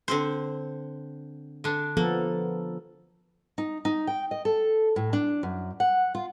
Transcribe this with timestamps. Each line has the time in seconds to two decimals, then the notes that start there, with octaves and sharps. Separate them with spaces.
0.08 D3 C4 C5
1.64 D3 D4
1.97 F3 A#3 B3 A4
3.58 D#4
3.85 D#4
4.07 G5
4.31 D#5
4.45 A4
4.96 A2
5.13 D4
5.43 F#2
5.80 F#5
6.15 F4